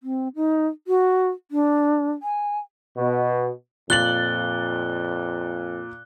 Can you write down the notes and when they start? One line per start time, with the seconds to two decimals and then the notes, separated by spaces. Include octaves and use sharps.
0.03 C4
0.36 D#4
0.87 F#4
1.51 D4
2.23 G#5
2.97 B2
3.90 F2 A#2 F#6 A6 F#7 G7